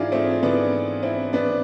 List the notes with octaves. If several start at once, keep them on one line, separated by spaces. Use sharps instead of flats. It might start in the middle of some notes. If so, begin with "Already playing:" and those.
Already playing: G#2 E3 D4 E4 F4 G#4
A3 C4
G#2 E3 B3 D4
C4 E4
A2 E3 B3 D4